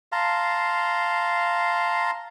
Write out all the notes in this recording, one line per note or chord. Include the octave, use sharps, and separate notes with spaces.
F5 A5 A#5 C6